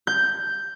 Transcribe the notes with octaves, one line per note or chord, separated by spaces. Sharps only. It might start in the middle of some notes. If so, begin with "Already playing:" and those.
G6